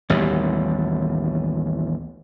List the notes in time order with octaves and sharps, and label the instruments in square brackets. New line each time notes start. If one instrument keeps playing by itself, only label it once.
[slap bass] A1 D#2 B2 G3